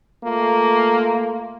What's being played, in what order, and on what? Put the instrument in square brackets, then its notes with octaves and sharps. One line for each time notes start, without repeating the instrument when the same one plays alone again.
[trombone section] A3 A#3 F4